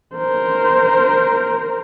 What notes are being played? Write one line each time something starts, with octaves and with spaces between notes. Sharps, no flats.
A#4 C5